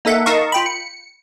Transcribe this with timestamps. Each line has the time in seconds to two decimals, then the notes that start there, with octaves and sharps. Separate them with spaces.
0.05 A#3 D#4 A4 E5 F#5
0.26 D#4 A#4 D#5 F5 A5 C#6
0.52 F4 G5 B5
0.66 C#7